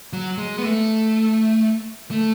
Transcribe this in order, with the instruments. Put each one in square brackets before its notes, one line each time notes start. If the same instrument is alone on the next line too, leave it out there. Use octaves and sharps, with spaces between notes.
[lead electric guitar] F#3
G#3
B3
A3
A3